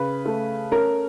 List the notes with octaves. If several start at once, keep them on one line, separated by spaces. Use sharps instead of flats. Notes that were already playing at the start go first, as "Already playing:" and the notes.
Already playing: C#3 B4
A3
C#4 A#4